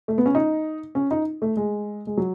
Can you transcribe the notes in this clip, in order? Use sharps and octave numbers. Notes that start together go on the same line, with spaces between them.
A3
B3
C#4
D#4
C#4
D#4
A3
G#3
G#3
F#3